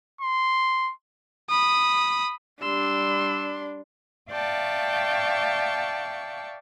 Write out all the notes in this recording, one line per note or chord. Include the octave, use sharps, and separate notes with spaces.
C6
B5 D#6
G3 D4 C6 E6
D5 E5 F5 G5 A5 C#6